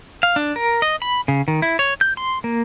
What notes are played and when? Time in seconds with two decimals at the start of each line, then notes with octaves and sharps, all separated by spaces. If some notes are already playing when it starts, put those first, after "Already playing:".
0.23 F5
0.36 D4
0.56 A#4
0.82 D#5
1.02 B5
1.28 C#3
1.48 D#3
1.62 E4
1.79 C#5
2.01 G6
2.17 C6
2.44 A#3